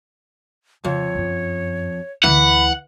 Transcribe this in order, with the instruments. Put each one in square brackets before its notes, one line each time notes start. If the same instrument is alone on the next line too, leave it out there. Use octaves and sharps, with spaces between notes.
[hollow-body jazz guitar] F2 [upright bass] C#3 [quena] C#5
[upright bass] F#2 F4
[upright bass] D2 D3 [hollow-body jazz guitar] E3 [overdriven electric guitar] F#5 [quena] B5